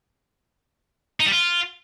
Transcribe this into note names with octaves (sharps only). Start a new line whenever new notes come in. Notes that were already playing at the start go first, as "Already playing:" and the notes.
D#4
G3
F4